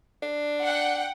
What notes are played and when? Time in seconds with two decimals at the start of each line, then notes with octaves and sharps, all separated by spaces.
0.22 D4
0.63 F#5 G5